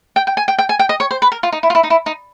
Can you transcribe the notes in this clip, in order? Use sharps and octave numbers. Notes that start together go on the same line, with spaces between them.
G5
G5
G#5
G5
G5
G#5
G5
D#5
C#5
C5
B4
A#4
F4
D#4
E4
F4
E4
D#4
E4
D#4